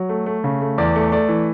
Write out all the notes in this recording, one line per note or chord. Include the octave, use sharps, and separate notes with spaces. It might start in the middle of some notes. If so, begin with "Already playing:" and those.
Already playing: F#3
A3
A3
C#3
A3
E2 D5
A3
A3 D5
E3